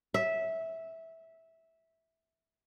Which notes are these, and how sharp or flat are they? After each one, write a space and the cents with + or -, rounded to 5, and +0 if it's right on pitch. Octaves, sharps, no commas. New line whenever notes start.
E5 -10